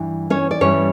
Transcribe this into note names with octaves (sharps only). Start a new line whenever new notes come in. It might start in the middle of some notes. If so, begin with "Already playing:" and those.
Already playing: G2 E3
C#4 C#5
D5
G2 E3 G3 C#4 C#5